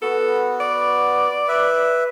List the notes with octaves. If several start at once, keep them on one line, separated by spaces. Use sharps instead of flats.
B3 F#4 A4 B4
D5
B4 E5